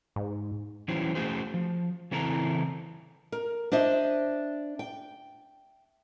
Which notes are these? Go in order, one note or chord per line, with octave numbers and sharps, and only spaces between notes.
G#2
E3 F#3 G3 C#4 E4 C5
A3 C#4 F#4 G#4 C5
F3
C#3 E3 C4 E4 A4 A#5
A#4
D4 C5 D#5 E5
G5